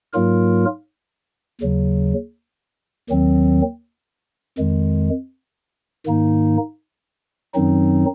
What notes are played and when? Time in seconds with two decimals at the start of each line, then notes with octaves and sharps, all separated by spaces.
0.13 G#2 F#3 A#3 F4 A#4
1.61 D#2 C#3 F#3
3.10 D#2 D#3 F#3 C4
4.58 F2 D#3 G#3
6.06 G#2 D#3 A#3 D#4
7.54 F#2 D#3 F#3 C4 D#4